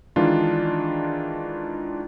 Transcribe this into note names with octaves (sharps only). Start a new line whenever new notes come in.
D#3 E3 G#3 D4 F4